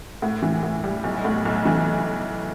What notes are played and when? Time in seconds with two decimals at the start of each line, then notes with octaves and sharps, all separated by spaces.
0.22 A2
0.42 E3
0.63 A2
0.84 G3
1.04 B1
1.25 A2
1.45 B1
1.65 E3